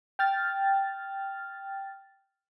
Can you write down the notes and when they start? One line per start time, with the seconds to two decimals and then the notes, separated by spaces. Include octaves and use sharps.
0.19 G5 F6 A6